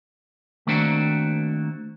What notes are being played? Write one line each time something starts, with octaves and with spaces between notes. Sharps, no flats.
D#3 A3 A#3 C4 D4 F#4